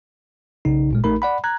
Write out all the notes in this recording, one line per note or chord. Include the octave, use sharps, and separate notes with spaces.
B1 C#3 D#4
G#1 A#2 G#3
A1 A3 D#4 A#4 B5
D5 F#5 B5
A#5 F#6 G#6